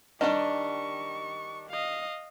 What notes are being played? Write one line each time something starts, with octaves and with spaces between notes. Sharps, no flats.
D#3 G3 D4 D#5 C#6
D#5 F5